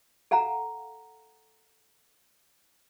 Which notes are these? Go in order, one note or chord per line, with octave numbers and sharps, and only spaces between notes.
A4 F5 F#5 A#5